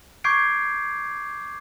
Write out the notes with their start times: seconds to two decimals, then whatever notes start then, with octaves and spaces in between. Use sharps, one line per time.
0.24 C#6 D6 G6 G#6 C7 D7